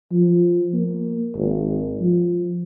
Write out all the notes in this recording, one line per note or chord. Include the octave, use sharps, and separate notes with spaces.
F3
A#3
G#1
F3